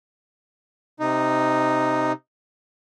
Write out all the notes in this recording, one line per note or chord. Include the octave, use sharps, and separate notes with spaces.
C3 D#4